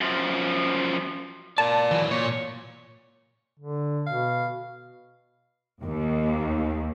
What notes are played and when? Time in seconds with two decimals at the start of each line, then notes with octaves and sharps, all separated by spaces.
0.01 F#2 F3
1.58 A#4 D5 A5
1.91 E3 F#3
2.11 A#2 C#5
3.59 D3
4.06 B2 F5
5.84 D#2